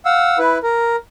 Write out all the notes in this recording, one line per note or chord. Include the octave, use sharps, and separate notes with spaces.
F5 F#5 E6
E4 B4
A#4